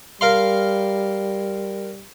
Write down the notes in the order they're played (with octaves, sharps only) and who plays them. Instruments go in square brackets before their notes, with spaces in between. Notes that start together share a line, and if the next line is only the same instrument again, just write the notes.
[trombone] G3 [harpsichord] A#4 F5 C6